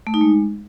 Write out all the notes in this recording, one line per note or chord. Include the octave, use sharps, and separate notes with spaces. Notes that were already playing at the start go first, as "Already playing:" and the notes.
A3
D#4
G#3